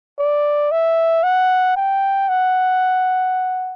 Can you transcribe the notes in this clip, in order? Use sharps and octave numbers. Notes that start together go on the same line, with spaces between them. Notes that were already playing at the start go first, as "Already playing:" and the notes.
D5
E5
F#5
G5
F#5